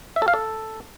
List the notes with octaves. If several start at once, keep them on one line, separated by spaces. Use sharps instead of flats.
E5
A4
F5
A4